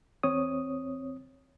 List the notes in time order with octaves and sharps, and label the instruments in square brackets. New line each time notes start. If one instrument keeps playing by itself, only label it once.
[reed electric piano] E2 C4 C#5 D#6